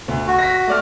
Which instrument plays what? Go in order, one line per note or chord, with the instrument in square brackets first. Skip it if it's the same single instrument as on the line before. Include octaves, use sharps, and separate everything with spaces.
[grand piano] D2
[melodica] F#4
[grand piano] A#6 B6
A3 D5 F6